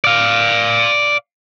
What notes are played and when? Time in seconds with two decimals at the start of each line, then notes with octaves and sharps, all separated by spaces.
0.04 D5 F5